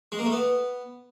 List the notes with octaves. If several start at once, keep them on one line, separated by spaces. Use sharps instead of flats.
G#3
A#3
A3
B3